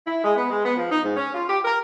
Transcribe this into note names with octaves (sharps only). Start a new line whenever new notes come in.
E4
G#3
B3
G#3
B3
F3
D#4
G#2
C#4
F4
G4
A#4